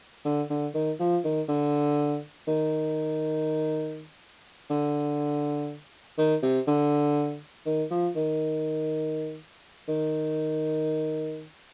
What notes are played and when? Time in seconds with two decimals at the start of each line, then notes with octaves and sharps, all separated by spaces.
0.25 D3
0.50 D3
0.74 D#3
1.00 F3
1.24 D#3
1.48 D3
2.48 D#3
4.70 D3
6.18 D#3
6.43 C3
6.67 D3
7.66 D#3
7.91 F3
8.16 D#3
9.89 D#3